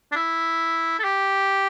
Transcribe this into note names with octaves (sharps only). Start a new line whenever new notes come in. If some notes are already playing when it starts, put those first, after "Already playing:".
D4
E4
A4
G4